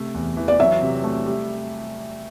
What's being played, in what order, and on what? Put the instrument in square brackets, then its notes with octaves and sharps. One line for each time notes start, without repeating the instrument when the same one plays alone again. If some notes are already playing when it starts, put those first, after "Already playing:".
Already playing: [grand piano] C3 A3
E2
E3
[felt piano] D5
[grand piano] F#3 [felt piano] E5
[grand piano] C3
A3
G3